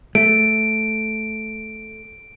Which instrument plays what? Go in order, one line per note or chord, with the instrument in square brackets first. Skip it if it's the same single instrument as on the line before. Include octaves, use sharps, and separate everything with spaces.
[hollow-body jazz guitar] A3 [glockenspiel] D7